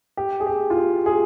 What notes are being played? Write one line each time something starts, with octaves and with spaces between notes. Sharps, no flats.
G4
G#4
G4
F4
G4
G#4